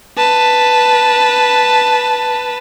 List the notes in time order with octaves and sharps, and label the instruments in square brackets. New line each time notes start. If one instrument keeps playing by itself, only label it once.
[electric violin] B4 A5